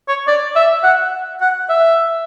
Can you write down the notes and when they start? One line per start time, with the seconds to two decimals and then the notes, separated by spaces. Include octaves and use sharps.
0.08 C#5
0.28 D5
0.56 E5
0.84 F#5
1.41 F#5
1.69 E5